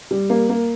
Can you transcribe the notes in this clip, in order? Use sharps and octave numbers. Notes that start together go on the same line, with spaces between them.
G3
A#3
A#3